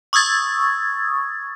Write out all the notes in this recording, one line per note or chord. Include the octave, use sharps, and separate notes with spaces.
C#6 D#6 E6 G#6 A6